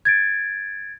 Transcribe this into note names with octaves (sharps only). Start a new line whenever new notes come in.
G#6 A6 D7